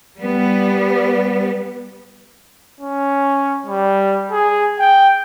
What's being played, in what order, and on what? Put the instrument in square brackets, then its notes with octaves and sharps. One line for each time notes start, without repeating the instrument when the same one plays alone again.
[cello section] G3 B3
[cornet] C#4
G3
G#4
G5